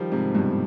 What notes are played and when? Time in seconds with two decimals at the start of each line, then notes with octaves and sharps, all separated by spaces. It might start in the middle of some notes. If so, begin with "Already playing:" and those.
Already playing: D#3 F3 G3
0.12 G#2 C3
0.34 G2 B2